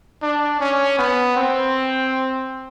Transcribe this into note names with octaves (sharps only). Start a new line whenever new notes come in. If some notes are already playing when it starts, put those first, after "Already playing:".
D4
C#4
B3
C4